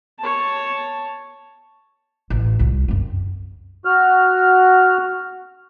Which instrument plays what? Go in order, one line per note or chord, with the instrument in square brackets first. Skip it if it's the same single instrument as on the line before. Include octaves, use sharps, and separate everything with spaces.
[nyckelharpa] C#5 A5
[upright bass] A1
C2 F4
F#2 C4
[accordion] F#4 F6